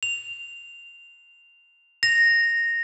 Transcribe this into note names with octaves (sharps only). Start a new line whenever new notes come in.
F7
A#6 F7